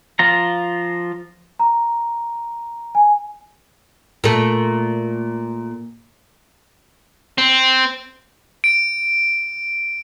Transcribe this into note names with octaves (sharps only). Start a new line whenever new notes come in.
F3 F4 A#5
A#5
G#5
A#2 A3
C4
D7